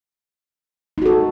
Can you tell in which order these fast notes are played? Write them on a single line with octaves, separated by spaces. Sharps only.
D#4 F#4 A4